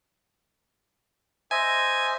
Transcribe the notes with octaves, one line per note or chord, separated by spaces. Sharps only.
C5 D#5 E5 G#5